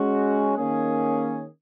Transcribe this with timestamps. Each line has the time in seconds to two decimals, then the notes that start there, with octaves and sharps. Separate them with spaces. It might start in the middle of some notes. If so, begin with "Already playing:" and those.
Already playing: G#3 C#4 F#4
0.56 D#3 A#3 C#4 G#4